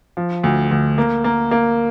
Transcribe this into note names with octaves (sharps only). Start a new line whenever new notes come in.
F3
D2
D2
A#3
A#3
A#3